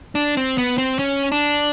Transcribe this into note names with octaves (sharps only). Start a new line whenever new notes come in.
D4
C4
B3
C4
C#4
D4